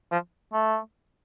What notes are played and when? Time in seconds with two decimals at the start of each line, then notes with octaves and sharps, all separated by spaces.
0.11 F3
0.53 A3